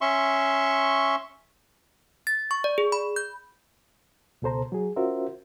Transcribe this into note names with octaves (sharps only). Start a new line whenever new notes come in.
C#4 E5 C6 C#6
A6
C#6
D5
G#4
B5
G6
C#2 B2 A4 C5 A#5
F#3 G#4
C#4 F4 F#4 A#4 C5 E5